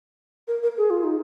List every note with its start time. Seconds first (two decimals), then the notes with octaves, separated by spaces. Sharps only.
0.48 A#4
0.63 A#4
0.78 G#4
0.90 F4
1.04 D#4